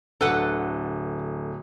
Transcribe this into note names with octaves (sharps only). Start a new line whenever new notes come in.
D1 D3 A3 A4 B4 F#5